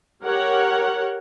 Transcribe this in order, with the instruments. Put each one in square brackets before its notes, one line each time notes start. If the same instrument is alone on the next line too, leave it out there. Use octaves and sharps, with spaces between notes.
[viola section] G4 A#4 C#5 F#5